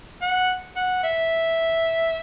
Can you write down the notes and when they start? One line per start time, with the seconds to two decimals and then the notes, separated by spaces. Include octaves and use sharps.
0.22 F#5
0.76 F#5
1.04 E5